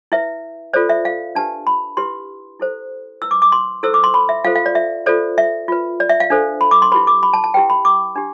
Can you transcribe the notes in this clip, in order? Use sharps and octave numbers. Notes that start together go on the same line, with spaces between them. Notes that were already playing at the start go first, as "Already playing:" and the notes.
E4 B4 E5
F4 A4 C5 D5
E5
F5
D4 G4 B4 A5
B5
E4 G4 B4 C6
E4 A4 C5
E4 B4 E6
D6
D6
C6
E4 A4 C5 E6
D6
C6
B5
E5
F4 A4 C5 F5
F5
D5
E5
F4 A4 C5 D5
E5
F4 B4
D5
E5
F5
D4 A4 C5
B5
D6
C6
E4 G4 B4 B5
D6
B5
A5
A5
E4 G4 B4 G5
B5
D6
D4 G4